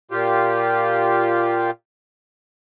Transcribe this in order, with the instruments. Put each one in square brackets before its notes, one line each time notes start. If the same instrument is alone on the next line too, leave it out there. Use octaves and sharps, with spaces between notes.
[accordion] A#2 F4 G4